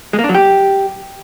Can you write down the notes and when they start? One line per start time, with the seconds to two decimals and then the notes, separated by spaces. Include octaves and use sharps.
0.13 G#3
0.19 A#3
0.24 D4
0.29 F#3
0.35 G4